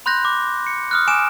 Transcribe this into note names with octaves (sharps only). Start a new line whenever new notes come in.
B5 C6 F#6 G6 A#6
D6
C#7
D#6 F6 F#6
G#5 D6 D#6 D7 E7